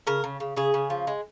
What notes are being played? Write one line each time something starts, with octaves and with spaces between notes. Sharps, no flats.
C#3 A#4
C#3
C#3
C#3 G#4
C#3
F3
G#3